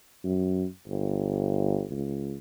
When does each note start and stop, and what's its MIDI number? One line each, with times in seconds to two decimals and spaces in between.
0.25 0.65 42
0.88 1.84 31
1.91 2.36 37